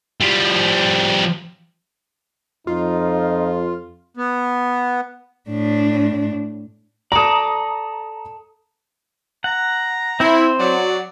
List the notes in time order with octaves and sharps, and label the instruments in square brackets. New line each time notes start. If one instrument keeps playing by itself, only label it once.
[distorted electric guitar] F3 G3
[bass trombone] F2 [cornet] D#4 [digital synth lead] F4
[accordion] B3
[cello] A2 D4
[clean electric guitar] A4 D5 [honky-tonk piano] A#5 D#6
[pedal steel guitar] F#5 [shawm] A#5
[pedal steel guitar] C4 C5 [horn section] E4
[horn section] F#3 [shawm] D5